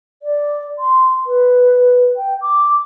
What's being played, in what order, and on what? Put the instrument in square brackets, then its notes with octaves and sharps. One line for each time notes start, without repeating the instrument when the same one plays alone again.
[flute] D5
C6
B4
G5
D6